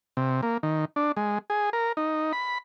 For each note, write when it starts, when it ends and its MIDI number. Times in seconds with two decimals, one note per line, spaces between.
0.17 0.41 48
0.43 0.58 58
0.63 0.85 51
0.96 1.12 62
1.17 1.38 56
1.50 1.70 68
1.73 1.92 70
1.97 2.32 63
2.33 2.58 83